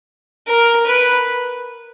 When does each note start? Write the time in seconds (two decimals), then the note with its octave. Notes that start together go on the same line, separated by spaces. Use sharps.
0.47 A#4
0.86 B4